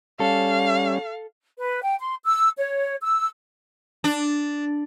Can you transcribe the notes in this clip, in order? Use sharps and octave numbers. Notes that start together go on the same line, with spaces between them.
G3 C#4 A4 F5
B4
G5
C6
E6
C#5
E6
D4